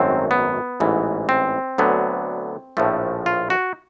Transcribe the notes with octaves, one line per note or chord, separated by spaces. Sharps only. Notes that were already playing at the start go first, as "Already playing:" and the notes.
Already playing: G#1 F#2 D#3 F#3 A3 C4
B3
A1 G#2 E3
C4
D2 D3 F#3 B3
A#1 A2 F3 A3
F4
F#4